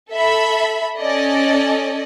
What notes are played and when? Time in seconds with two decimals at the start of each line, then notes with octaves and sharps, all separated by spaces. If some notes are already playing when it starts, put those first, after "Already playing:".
0.11 A4 E5 B5
0.97 C#4 A4 D5 D#5